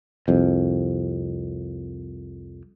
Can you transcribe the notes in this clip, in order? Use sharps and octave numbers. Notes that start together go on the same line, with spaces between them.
C2 F2